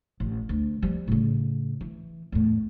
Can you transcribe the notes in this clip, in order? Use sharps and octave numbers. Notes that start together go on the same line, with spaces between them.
A1
D2
F3 G3
A2 C#3
E3
E2 A2